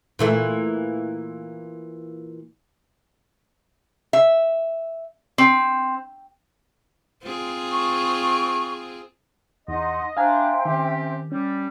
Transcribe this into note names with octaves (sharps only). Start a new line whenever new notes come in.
A#2 E3 A3
E5
C4
C4 F4 G#4
C#6
E2 D#4 D#5 F#5 C6
D4 C5 E5 F5 G5 G#5 A#5
D#3 C4 C#4 G4
G3 C#4